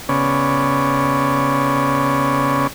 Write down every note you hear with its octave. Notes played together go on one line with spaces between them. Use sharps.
C#3 B3 C#4 D5